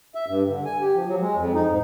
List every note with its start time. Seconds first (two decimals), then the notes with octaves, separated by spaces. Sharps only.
0.15 E5
0.28 G2
0.49 D3
0.65 G#5
0.81 G4
0.95 F3
1.08 F#3
1.20 G#3
1.36 F2
1.55 D#4
1.70 G#2